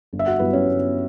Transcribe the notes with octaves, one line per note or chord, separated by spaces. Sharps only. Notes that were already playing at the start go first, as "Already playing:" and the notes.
G1
E5
F#4 F#5
G2 F#3 B3 E4 B4
C#4 C#5
G1